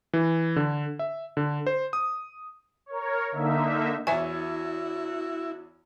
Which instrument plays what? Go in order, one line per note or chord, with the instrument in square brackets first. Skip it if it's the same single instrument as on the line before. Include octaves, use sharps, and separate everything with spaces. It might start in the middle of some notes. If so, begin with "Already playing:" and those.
[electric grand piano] E3
D3
E5
D3
C5
D#6
[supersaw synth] A#4 C#5
D3 A#3 D#4 E5
[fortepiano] E2 C#5 [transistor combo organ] E4 [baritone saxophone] F#4 [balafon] E5 G#5